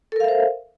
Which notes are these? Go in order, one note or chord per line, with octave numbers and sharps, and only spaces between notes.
A4 A#4 C5 E5 F5